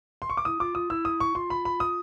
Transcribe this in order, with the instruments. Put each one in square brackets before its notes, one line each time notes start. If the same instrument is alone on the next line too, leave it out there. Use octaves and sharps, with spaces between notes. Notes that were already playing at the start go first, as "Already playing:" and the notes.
[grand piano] C6
C#6
D6
[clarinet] E4 [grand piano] D#6
[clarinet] F4 [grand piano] D6
[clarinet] F4 [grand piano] D#6
[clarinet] E4 [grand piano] E6
[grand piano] D#6
C#6
[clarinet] F4 [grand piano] C6
[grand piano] B5
B5
D#6